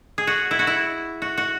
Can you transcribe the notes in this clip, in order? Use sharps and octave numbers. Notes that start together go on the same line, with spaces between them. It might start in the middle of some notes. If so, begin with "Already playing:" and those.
G#4
F#4
E4
F#4
E4
F#4
F#4